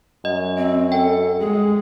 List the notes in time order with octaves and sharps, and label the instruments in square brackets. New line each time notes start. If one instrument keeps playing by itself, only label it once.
[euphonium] F#2 [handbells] D#5
[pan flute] C4
[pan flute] A4 [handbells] G5
[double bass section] G#3 [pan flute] G#4